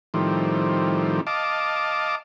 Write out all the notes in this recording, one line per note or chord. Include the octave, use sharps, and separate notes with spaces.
A2 D#3 F3 G3 C4
D#5 F5 A5 D6